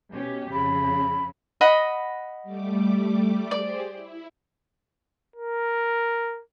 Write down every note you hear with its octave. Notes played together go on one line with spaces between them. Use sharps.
B2 C#4 G4
F2 C#3 B5
D#5 F#5 B5
G3 A3 D6
G4 G#4 C5 D5
E4
A#4